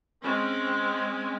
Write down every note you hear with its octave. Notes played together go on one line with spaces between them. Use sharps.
G#3 C4 C#4